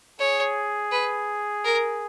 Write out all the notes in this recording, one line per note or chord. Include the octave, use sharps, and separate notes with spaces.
G#4 C#5
B4
A#4